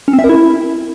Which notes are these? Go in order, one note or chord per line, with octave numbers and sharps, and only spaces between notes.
C#4
C4
E5
A#4
E4